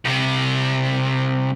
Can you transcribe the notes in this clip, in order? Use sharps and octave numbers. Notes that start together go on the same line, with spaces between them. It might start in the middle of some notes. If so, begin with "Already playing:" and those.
C2 C3